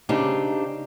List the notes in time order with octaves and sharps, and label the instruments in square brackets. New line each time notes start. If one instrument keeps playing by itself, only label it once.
[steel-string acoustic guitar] C#3 C4 D4 D#4 G4